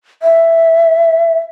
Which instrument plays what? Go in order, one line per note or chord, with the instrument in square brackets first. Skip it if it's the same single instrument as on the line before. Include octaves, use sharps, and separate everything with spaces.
[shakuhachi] E5